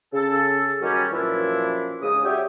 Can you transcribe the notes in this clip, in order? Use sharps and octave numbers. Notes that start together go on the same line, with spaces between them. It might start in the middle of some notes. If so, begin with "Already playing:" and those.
C#3 A4
D#3 F#3 G3 C#4
F#2 A#2 E3 F3 D4 E4
G#2 C#3 D#6
F#4 G4 C#5 D5 E5 G5